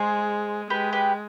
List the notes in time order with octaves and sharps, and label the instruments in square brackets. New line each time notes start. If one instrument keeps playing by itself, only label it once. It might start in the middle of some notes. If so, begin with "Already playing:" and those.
Already playing: [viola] G#3 [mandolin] G#4 C5
[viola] G#3 [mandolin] G4 B4
[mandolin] G4 B4